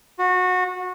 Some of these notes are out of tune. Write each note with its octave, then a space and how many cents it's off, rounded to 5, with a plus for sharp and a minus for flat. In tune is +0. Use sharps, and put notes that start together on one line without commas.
F#4 -20